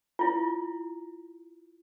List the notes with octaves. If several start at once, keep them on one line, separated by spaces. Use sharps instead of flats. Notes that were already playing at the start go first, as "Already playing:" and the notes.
E4 F4